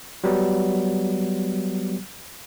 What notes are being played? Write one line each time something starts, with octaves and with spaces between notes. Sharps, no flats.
F#3 G3 B3